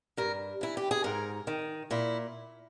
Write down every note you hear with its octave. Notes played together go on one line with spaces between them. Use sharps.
G2 A#4
E3 E4
G4
G#4
G#2 A#4
D#3
A#2 E4